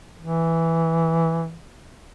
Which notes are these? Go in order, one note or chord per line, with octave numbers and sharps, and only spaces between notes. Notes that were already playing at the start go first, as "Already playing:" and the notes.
E3